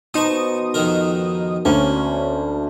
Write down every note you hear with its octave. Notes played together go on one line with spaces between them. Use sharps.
B2 D#4 C5 A5 C#6 D#6
F2 D#3 A#4
D2 A#3 C#4 D4